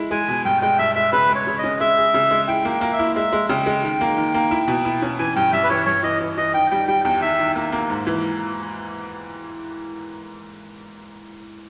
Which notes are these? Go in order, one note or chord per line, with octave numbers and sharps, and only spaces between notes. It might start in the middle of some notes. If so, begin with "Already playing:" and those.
Already playing: G#3 E4
G#3 G#5
B2
G2 G5
G#3 G5
G2 E5
G#3 E5
C#3 B4
G#3
C#5
C#3
D#5
C#4
G#3 E5
G#4
C#3
G#3
E4 G5
A#3
G5
A#3
E5
E4
G#3 E5
G#3
C#3 G5
G#3
D#3
A#3
D#3
A#3
E4
B2
E4
C#4
E3 G#5
G2 G5
G2 E5
B4
E3 C#5
G2 C#5
E3 D#5
E3
E3 D#5
D#3 G5
G3 G5
G3 G5
E2 G5
D#3 E5
D#3
A#3
A#3
G#2
E3